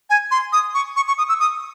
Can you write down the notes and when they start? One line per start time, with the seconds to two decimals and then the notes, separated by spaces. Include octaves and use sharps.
0.10 G#5
0.31 C6
0.53 D#6
0.74 C#6
0.96 C#6
1.08 C#6
1.18 D#6
1.29 E6
1.40 D#6